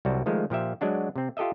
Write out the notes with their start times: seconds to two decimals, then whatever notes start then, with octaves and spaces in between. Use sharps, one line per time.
0.05 C2 F#3 G3 F#4 A5
0.26 D#3 F3 G#3 A3
0.50 A#2 F3 G4 E5
0.81 F#3 G#3 D4 F#4
1.16 C3 C4
1.37 F4 G4 A4 D#5 E5